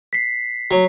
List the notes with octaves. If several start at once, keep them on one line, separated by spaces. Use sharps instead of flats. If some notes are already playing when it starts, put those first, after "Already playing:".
B6 C7
F#3